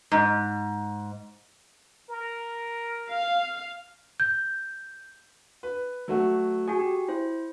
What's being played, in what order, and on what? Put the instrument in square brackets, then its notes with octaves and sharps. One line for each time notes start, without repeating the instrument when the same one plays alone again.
[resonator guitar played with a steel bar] G#2
[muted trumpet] A#4
[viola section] F5
[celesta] G6
[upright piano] B4
F#3 A3 F#4
[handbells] F#4 G#4 [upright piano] G#5
[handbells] G4
E4 C5